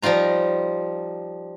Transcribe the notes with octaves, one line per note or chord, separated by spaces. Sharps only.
F3 G3 D#4 F4 A#5